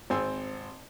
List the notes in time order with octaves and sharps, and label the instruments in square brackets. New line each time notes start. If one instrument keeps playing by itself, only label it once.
[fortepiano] G#1 C4 G#5 C6 E6